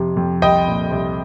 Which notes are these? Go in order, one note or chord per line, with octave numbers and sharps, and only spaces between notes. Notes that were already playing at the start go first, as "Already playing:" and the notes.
Already playing: F2 C3
F2
C2 D#5 G5
A#2
C2